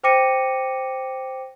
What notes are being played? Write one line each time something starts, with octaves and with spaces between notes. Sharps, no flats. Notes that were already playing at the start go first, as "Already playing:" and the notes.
C5 G5 D6 A#6 C#7 D#7